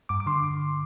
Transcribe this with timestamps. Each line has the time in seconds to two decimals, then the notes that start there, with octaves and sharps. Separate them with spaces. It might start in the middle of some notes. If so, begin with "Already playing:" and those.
0.09 G2 D6
0.20 D6
0.26 D3 C6